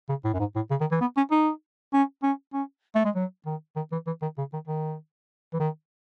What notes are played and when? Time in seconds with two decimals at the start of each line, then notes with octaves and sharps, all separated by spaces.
0.09 C#3
0.25 A2
0.34 F#2
0.39 G#2
0.56 A2
0.71 C#3
0.80 D#3
0.92 E3
1.01 B3
1.17 C#4
1.31 D#4
1.93 C#4
2.23 C#4
2.53 C#4
2.95 A3
3.05 G#3
3.15 F#3
3.46 D#3
3.76 D#3
3.92 E3
4.07 E3
4.22 D#3
4.38 C#3
4.53 D#3
4.68 D#3
5.53 E3
5.60 D#3